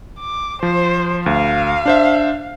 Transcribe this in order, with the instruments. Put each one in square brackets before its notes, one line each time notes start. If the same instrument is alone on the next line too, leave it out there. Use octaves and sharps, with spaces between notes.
[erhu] D6
[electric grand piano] F3 [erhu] C5
[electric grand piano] D2 [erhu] F5
[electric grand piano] D4 C5 E5